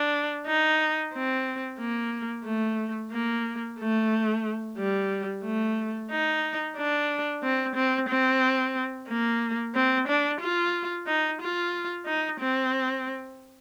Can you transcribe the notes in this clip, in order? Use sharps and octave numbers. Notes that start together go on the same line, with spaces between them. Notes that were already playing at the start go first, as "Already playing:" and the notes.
Already playing: D4
D#4
C4
A#3
A3
A#3
A3
G3
A3
D#4
D4
C4
C4
C4
A#3
C4
D4
F4
D#4
F4
D#4
C4